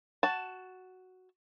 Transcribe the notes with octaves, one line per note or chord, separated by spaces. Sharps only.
F#4 A5